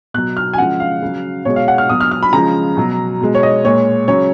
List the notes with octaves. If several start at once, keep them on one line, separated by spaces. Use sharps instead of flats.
B2 F#3 F#6
F6
G#5
C#3 F3 G#3 F#5
F5
C#3 F#3
B2 G#3 C#5
F5
F#5
F6
B2 F#3 D#6
F6
F6
B5
C#3 F3 G#3 A#5
B2 F#3
B2 G#3
C#5
D#5
A#2 G#3 C#5
C#3 F#3 C#5